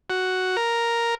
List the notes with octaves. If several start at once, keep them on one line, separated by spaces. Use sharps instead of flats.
F#4
A#4